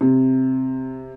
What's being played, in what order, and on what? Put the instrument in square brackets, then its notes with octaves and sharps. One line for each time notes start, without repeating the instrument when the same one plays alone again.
[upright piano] C3